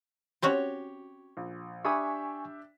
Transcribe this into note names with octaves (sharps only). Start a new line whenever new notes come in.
C4 C#4 F#4 G4 C#5
A#1
D4 G4 E5 G#5 B5 C#6 D#6